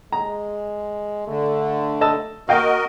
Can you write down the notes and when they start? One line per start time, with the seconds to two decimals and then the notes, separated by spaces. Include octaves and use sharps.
0.12 G#3 A#5
1.28 D3 A3
2.01 D#5 A5 E6
2.49 A#3 F#4 A#4 D#5 F5 G5